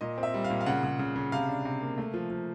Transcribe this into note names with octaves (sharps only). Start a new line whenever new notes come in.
A#2 D#5
C4
E5
G3
F5
A#2
F5
C#3 F#5
C#3
C#3
C#3
C3 F5
D4
C3
A#3
A3
F3
F3